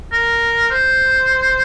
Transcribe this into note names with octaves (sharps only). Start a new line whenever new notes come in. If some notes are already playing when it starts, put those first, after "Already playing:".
A#4
C5